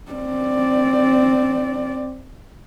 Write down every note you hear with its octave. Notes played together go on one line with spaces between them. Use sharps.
C4 D5